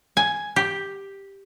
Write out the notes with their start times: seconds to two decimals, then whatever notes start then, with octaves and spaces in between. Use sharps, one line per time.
0.17 G#5
0.56 G4